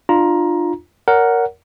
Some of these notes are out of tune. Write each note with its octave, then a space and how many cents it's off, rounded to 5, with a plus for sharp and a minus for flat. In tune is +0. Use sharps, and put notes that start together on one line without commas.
D4 +35 F4 +0 A#5 +15
A#4 +0 C#5 +45 F#5 +0